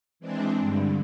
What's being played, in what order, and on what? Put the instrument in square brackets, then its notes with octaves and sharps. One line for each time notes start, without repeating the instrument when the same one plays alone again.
[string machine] E3 G#3 C4 D4
G2 D3